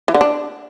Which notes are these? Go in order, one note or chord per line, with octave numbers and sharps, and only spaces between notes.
E3
D3
D4